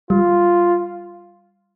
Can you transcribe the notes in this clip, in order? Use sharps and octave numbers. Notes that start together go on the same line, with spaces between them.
G3 F4